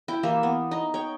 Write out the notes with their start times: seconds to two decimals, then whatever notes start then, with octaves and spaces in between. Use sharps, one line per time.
0.08 E4 G5
0.23 E3 A#3 G4 E5
0.43 B3
0.71 D#4
0.94 C#5 G5